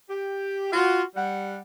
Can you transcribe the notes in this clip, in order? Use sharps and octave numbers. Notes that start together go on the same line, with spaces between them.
G4
F4 F#4
G3 F#5